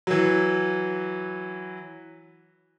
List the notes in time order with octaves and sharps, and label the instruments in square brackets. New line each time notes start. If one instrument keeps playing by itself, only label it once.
[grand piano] E3 F#3